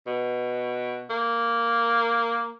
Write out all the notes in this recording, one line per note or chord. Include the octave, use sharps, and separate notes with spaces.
B2
A#3